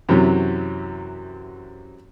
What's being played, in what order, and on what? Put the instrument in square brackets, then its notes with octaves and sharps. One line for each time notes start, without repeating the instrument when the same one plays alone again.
[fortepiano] F#2 C3 E3 F#3